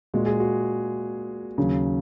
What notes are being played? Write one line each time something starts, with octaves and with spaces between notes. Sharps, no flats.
A#2 G#3 F#4
G#4
F#4
D#2 C#3 F#3